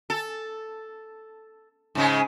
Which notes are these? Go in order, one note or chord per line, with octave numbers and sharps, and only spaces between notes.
A4
G#2 C#3 G#3